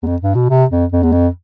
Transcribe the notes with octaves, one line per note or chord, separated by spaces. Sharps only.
E2
F2
G2
B2
C3
F2
F2
E2
F2